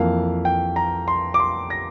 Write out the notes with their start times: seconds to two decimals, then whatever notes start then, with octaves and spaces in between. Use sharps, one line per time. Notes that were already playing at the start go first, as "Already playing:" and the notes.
Already playing: F2 E3 A#3 F5
0.45 G5
0.76 A#5
1.08 C6
1.34 D6
1.40 C6
1.70 A#6